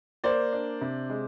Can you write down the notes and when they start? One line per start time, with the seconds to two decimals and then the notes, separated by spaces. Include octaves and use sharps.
0.24 A#3 C5 D5
0.52 D4
0.81 C3
1.10 G#3